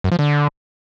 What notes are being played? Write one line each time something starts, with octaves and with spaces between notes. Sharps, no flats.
F#2
F3
D3